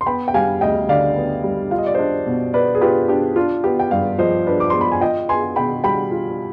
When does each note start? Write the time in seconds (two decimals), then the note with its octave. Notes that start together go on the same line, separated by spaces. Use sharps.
0.01 C6
0.06 B3 G5 B5
0.28 G5
0.34 G3 F5 G#5
0.61 D2 D#5 G5
0.88 D3 D5 F5
1.16 B3
1.44 G3
1.71 F4 F5
1.78 D#5
1.86 D5
1.94 D4 C5 D#5
2.26 B2
2.54 B3 B4 D5
2.75 G#4
2.81 F4 G4 B4
3.08 D4 G4
3.36 D4 F4
3.64 B3 G4
3.80 G5
3.91 G2 D5 F5
4.18 F3 C5 D#5
4.47 D4 B4 D5
4.60 D6
4.70 B3 C6
4.81 B5
4.92 G#5
5.01 F4 D#5 G5
5.29 B3 G#5 C6
5.56 B2 G5 B5
5.84 G3 G5 B5
6.11 F4